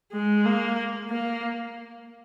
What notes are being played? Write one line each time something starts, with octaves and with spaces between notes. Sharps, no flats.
G#3
A#3
A#3